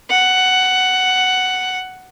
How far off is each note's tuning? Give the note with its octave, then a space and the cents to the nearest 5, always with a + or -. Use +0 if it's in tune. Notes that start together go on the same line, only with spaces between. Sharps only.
F#5 +10